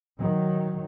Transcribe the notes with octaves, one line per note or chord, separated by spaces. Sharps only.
D#3 F#3